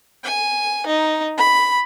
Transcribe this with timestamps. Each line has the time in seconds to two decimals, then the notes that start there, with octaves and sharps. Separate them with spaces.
0.24 G#5
0.86 D#4
1.38 B5